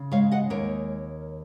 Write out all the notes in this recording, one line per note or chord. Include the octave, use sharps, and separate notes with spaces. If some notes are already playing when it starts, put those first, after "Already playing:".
Already playing: C#3
G#3 C#5 F5
D#5 F#5
D#2 A#4 C#5